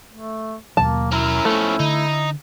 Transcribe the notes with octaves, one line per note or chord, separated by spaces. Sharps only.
A3
D#2 B2 F#3 A#3 A5
C#4 E4 A#4
F3 A3 C#4
D3 D#4